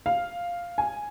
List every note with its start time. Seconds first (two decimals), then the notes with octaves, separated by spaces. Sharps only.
0.06 F5
0.78 G#5